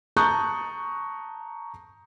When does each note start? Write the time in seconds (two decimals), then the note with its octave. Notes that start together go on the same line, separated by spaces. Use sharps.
0.16 A5 A#5 C#6 D#6 F#6 G6